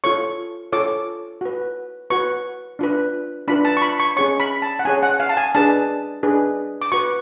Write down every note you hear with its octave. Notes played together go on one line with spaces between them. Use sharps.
F4 A4 C#5 C#6
F4 A4 C#5 D6
F#4 B4
F#4 B4 C#6
D4 F4 B4
D4 F4 B4 B5
A5
C#6
B5
C#6
C#4 G#4 C#5 C#6
B5
A5
F#5
C#4 G#4 C#5 G#5
F#5
F5
A5
G#5
D4 G#4 B4 A5
D4 G#4 B4
D6
F#4 B4 C#6